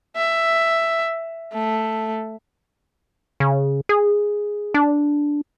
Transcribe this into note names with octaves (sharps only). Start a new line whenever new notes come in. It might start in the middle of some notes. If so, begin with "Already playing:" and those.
E5
A3
C#3
G#4
D4